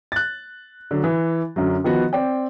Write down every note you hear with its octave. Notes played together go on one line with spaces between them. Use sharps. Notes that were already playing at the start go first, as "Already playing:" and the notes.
F#6 A6
D3 F#3
E3
F#2 D3 F#3
D#3 F3 B3 F#4
C4 D5 G5